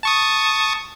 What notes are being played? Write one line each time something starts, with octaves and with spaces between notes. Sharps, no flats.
A5 C#6 D#6